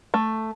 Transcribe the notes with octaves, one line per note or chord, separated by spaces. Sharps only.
A3